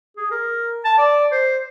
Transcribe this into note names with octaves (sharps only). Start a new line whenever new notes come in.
G#4
A#4
A5
D5
C5